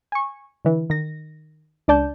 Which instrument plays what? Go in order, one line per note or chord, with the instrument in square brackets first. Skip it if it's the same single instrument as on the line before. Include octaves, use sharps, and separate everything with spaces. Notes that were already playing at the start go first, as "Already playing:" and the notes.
[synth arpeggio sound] G#5 C#6
D3 E3
D#3 A#6
C#2 D4 D5 A5 G6